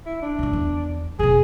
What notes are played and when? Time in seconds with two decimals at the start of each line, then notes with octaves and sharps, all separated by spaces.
0.06 E4
0.22 D4
0.39 B1 G3
0.53 E2
1.19 E1 B2 G#4